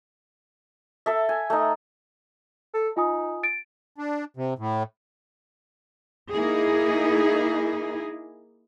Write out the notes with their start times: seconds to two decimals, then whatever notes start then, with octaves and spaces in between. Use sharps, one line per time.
1.06 A4 E5
1.29 G#5
1.50 A3 D#4
2.74 A4
2.97 D#4 F4 G#5 D#6
3.43 A6 D7
3.98 D4
4.37 C3
4.58 A2
6.32 A#3 D#4 E4 G#4